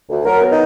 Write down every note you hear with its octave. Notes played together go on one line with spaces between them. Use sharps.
D2
F#3 A#4
B3
D#4